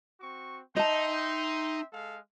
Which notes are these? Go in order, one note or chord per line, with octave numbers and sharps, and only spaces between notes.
C4 F#4 C#6
D#4 D#5 E5 G5 A5 C6
G#3 A4 F5